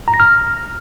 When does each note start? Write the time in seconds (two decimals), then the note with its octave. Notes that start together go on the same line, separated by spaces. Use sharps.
0.08 A#5
0.14 A#6
0.20 F6